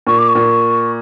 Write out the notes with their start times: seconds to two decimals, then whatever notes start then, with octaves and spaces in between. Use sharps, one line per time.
0.07 A#2 C#6
0.18 D6
0.29 C#6
0.35 A#2